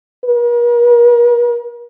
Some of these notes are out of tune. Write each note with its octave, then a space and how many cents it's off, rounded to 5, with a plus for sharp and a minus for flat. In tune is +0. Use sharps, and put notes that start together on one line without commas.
A#4 +45